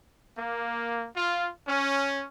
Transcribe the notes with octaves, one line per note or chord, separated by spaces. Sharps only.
A#3
F4
C#4